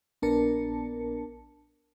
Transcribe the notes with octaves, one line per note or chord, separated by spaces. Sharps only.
A#1 B3 D4 A#4 A5 C#7